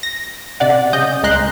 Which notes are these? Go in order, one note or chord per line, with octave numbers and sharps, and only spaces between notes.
A#6
C3 D5 F#5
C#3 D#5 G6
C#2 G#3 A#5 C6 F#6